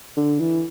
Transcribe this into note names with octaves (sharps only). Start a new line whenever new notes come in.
D3
E3